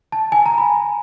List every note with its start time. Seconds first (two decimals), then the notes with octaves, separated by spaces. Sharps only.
0.12 A5
0.32 G#5
0.46 A#5
0.58 B5